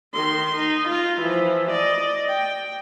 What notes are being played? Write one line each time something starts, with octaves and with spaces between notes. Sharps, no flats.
D#3 C6
D#4
F4
E3 F3
D5 D#5
G5